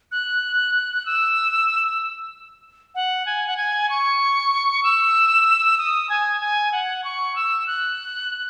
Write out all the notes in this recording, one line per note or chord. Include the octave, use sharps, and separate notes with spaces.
F#6
E6
F#5
G#5
F#5
G#5
C#6
E6
D#6
G#5
G#5
F#5
C#6
E6
F#6